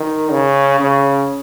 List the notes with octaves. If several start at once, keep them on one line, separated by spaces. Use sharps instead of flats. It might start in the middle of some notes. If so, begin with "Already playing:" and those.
Already playing: D#3
C#3
C#3